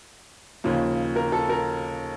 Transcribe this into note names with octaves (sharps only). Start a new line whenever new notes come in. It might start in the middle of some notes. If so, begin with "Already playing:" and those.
D#2 C#3 F3 A#3
A#4
A4
A#4